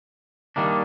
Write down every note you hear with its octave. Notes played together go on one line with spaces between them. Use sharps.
D#3 G3 A#3 D4